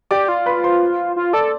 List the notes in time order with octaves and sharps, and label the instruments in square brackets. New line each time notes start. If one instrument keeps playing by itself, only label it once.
[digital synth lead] G4 [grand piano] D5 D6
[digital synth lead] F4
[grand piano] B4 B5
C5 C6
[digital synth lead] F4
[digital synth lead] A4 [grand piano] D5 D6